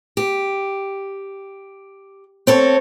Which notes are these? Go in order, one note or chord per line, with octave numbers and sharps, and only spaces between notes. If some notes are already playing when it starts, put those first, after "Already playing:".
G4
C4 A4 C#5